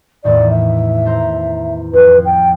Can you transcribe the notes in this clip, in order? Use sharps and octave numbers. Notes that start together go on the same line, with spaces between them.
E2 A2 D#3 D5
E5
A4 C5 A#5
F2 B4
G5